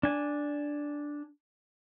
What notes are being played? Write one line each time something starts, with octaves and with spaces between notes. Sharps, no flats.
D4 G#5